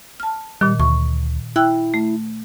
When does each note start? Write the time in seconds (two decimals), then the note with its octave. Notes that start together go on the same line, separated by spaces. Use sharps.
0.20 A5 F6
0.61 A#2 D#3 G3
0.80 D2 C#6
1.56 E4 G5 E6 F#6
1.94 A3